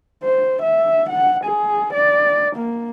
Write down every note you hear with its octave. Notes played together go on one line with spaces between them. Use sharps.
C5
E5
F#5
G#4
D5
A#3